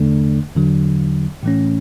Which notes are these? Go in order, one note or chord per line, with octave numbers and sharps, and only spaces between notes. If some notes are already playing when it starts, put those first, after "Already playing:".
Already playing: E2 D3 A3 D4
E2 D3 F#3
A2 E3 A3 C#4